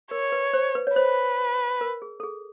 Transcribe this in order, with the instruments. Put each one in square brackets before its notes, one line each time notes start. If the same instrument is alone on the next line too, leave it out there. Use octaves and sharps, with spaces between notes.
[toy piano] A#4 [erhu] C#5
[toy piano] B4
C5
B4
C#5
[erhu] B4 [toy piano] C5
[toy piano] A#4
G#4
A4
G#4